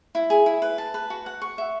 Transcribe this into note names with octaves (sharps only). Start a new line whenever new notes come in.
E4
G#4
E4
B4
A5
B4
F#4
F#5
C#6
E5